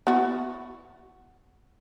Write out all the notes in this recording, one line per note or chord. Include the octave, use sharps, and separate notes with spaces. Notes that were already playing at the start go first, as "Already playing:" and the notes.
B3 E4 F#4